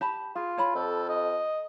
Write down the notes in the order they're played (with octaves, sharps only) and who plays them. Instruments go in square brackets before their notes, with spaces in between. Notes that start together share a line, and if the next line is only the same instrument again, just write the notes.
[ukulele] G4 A5 B5
[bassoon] F4 [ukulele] G#4
[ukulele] C#5 A5 B5
[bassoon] F2 [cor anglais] A4
[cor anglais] D#5